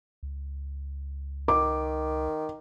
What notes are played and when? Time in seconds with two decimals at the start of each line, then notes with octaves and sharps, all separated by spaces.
0.23 C#2
1.48 D#3 D6